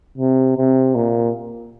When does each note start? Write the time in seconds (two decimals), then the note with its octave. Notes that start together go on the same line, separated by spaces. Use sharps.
0.18 C3
0.57 C3
0.95 A#2